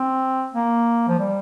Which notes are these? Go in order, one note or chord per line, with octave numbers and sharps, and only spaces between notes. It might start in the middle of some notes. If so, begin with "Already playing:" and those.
Already playing: C4
A#3
F3
G3